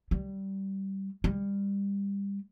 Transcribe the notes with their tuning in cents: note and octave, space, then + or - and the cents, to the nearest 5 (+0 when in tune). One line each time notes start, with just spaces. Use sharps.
G3 -15
G3 +25